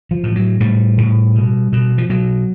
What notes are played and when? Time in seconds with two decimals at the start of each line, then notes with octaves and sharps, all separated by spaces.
0.11 F3
0.23 A2
0.36 F#3
0.60 A2 G3
0.98 A2
1.35 B2
1.73 B2
1.98 F3
2.09 B2 F#3